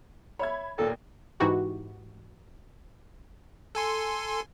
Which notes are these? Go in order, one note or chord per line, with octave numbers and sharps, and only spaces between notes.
C#5 E5 B5 G#6
D#2 A#2 A#3 A4
G#2 E3 D#4 E4 F#4 G4
A4 G#5 C6